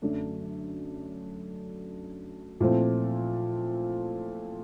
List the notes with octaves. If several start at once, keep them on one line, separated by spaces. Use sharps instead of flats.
F#2 D3 F#3 A3 D4
A#2 F3 A3 C4 E4